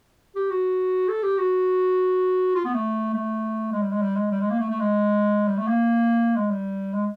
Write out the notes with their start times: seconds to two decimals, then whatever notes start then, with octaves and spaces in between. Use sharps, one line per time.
0.36 G4
0.51 F#4
1.09 A4
1.23 G4
1.38 F#4
2.55 F4
2.65 B3
2.74 A3
3.14 A3
3.72 G#3
3.82 G3
3.92 G#3
4.02 G3
4.16 G#3
4.31 G3
4.41 G#3
4.51 A#3
4.60 A3
4.70 A3
4.80 G#3
5.48 G3
5.58 A3
5.68 A#3
6.36 G#3
6.51 G3
6.94 G#3